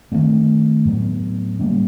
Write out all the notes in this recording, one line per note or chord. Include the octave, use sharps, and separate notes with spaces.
D#3 F#3 A3 C4
A2 F#3 B3
D3 G3 A#3 C#4